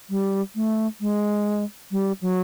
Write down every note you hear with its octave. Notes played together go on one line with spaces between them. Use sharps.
G3
A3
G#3
G3
F#3